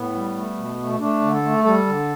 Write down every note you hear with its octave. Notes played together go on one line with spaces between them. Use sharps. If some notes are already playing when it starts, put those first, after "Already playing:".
Already playing: A2 B3
G3
A3
B2
A3
A3 D4
D3
A4
A3
G3 A4
D3